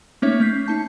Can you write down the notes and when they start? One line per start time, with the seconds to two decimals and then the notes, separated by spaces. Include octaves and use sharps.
0.22 A3 A#3 C#4 D#4 C#5 E5
0.40 A3 C#4 G6 B6 C7
0.66 D#4 A5 G6